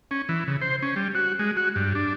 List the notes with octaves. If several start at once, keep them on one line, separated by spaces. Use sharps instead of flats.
C#4
E3
C#3
C5
C#4
G3
F#4
G#3
F#4
G2
D4